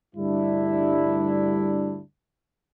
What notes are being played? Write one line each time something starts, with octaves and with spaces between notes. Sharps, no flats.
D2 G2 G3 D4 E4